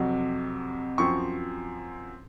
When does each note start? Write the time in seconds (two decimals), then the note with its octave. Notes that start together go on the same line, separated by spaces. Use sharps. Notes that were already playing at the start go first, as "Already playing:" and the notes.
Already playing: F2 C3 F#3
0.98 F#2 F3 C4 C#6